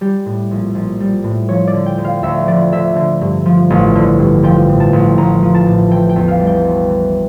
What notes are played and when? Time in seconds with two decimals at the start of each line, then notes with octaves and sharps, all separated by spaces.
0.01 G3 G4
0.26 A2
0.51 A#1
0.75 A#1
1.00 G3
1.24 A2
1.49 F3 C#5
1.67 D5
1.73 D3
1.86 G5
1.98 D2
2.05 F5
2.23 D2 E5
2.47 F3 D5
2.72 D3 E5
2.96 D3
3.21 G2
3.46 F3
3.70 A1
3.95 D3
4.19 G2
4.43 F3 G5
4.69 A2
4.80 A5
4.93 A1
5.18 A1 A#5
5.43 F3
5.54 A5
5.67 A2
5.91 E3 G5
6.09 G5
6.16 E2
6.28 F5
6.40 G3
6.47 G5
6.65 E1
6.90 E3